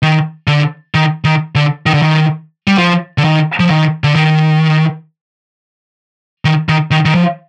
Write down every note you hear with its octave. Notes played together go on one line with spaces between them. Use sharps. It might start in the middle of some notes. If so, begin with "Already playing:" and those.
D#3
D3
D#3
D#3
D3
D#3
D3
D#3
G3
F3
D3
D#3
F3
D#3
D3
D#3
D#3
D#3
D#3
D#3
F3